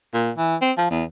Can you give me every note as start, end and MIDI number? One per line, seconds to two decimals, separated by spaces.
0.14 0.31 46
0.37 0.56 52
0.62 0.72 60
0.78 0.88 53
0.90 1.04 40